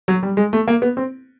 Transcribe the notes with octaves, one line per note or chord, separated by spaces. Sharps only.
F#3
G3
G#3
A3
A#3
B3
C4